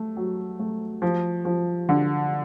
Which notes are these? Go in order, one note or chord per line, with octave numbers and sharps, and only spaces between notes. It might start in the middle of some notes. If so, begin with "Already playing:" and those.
Already playing: A3
F#3
A3
F3
F3
D3